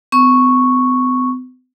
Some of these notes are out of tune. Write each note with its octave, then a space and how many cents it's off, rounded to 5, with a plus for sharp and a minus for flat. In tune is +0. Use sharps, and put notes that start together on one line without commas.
B3 +45 C#6 +0